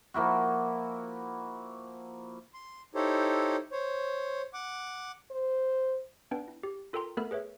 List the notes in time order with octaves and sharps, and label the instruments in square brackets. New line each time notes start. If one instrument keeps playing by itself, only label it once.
[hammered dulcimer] F3 A#3 E4 F#4
[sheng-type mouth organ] C6
D#4 E4 G4 A4 C5 C#5
C5 C#5
F#5 D6
[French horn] C5
[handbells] B3 D4 B4 G5
E4
G4
F4 A4 A#4 G5 A#5 C6
A3 B3 A4 A#4 B5
G#4 B4 C#5 E5